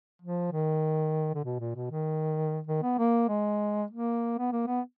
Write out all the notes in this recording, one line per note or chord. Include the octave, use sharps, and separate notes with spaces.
F3
D#3
D3
B2
A#2
B2
D#3
D#3
B3
A#3
G#3
A#3
B3
A#3
B3